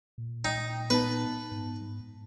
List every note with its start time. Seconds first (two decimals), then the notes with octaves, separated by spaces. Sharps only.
0.18 A#2
0.45 D#4 G5
0.90 B3 D#4 B4 A5
1.52 G#2